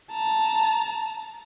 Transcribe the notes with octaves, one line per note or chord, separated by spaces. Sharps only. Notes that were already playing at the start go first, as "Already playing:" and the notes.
A5 A#5